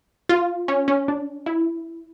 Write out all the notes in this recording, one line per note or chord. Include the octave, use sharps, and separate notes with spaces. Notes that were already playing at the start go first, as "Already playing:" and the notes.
F4
C#4
C#4
D4
E4